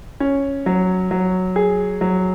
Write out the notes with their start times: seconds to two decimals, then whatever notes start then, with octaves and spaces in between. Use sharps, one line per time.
0.20 C#4
0.66 F#3
1.11 F#3
1.56 G#4
2.01 F#3